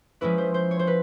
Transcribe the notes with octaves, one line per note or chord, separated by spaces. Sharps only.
F3 G#3 C#4 E4 B4
C5
C5
C#5
C5
B4